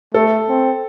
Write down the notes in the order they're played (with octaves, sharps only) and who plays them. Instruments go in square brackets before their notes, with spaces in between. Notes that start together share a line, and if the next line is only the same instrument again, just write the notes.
[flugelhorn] A3 [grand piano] A4
[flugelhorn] C4